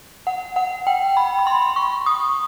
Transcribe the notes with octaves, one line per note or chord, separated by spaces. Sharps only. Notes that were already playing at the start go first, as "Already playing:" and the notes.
F#5
F#5
G5
B5
B5
C6
C#6
D#6